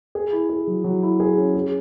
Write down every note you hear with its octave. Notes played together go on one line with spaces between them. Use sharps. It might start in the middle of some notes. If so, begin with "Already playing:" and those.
G#4
E4
G#4
F#3
F#3
E4
G#4
C#4
G#4